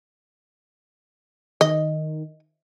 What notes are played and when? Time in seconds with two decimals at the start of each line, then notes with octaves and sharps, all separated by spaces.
1.61 D#3 D#5